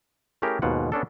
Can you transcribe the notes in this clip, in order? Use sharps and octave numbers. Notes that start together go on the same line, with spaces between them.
A3 C#4 E4 G4 G#4 A#4
D#2 G#2 B2 F4 F#5
B3 C#4 D4 A4